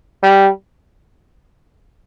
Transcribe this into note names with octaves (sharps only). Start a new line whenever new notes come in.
G3